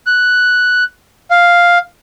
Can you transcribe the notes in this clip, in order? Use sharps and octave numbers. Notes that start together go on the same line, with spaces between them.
F#6
F5